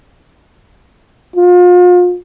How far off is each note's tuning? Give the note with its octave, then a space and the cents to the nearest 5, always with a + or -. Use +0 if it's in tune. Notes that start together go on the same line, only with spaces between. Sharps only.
F4 +35